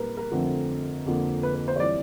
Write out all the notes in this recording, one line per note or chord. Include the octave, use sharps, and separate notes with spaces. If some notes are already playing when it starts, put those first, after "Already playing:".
Already playing: A#2 G3 A#3 D#4 A#4 B4
A#4
F2 D3 F3 A3 C4
F2 D3 F3 A#3
B4
B4
C5
C#5
E3 G3 C4 E4 D5